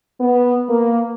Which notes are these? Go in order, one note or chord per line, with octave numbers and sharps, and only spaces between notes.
B3
A#3